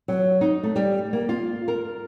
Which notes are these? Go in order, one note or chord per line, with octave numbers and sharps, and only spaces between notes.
F#3
D#4
A3
G3
A#3
F4
A#4